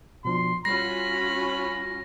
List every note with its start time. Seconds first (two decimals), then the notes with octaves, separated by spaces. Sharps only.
0.25 B2 F3 D4 C6
0.65 G3 C#4 F4 F#4 B5 A#6 C7